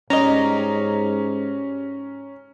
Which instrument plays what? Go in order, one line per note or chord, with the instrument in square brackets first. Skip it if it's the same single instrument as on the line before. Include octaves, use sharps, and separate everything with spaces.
[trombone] G#2 [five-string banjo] G3 D#5 [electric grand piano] C#4 [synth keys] A#5